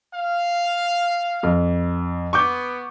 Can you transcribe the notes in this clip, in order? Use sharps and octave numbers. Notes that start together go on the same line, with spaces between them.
F5
F2
B3 C#6 D6 G6